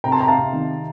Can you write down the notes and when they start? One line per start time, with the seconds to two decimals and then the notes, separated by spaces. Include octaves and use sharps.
0.04 C3 G5 A#5
0.12 A5 C6
0.20 C3 G5 A#5
0.28 F5 A5
0.36 C3
0.53 D#3